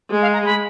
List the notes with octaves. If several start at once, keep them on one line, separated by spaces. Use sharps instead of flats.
G#3
F5
A#5
B5